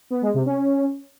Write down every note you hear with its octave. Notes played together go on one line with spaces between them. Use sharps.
B3
G#3
C3
C#4